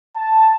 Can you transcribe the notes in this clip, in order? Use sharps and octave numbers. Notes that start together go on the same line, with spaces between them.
A5